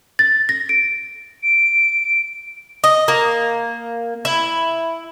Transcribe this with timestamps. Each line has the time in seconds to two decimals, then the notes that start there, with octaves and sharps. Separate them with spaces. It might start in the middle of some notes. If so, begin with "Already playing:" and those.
0.19 A6
0.49 A#6
0.69 D7
1.43 D7
2.84 D#5
3.08 A#3
4.25 E4